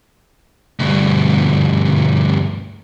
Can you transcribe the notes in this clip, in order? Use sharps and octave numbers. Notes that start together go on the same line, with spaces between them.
D2 G2